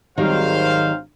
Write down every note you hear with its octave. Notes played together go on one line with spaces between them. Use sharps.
G#1 D#3 F#3 G3 C5 F5